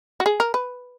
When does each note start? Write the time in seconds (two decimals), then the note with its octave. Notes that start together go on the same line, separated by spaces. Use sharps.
0.20 F#4
0.26 G#4
0.40 A#4
0.54 B4